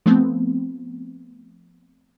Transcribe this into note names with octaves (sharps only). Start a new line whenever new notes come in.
F3 A3 B3 C4